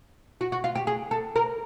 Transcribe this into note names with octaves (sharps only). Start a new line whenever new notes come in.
F#4
F#4
F4
G4
G#4
A4
A#4